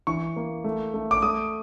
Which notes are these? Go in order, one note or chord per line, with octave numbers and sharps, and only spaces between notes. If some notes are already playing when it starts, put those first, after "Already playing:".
E3 C#6
A#3
A3
A3
D6
A3 D#6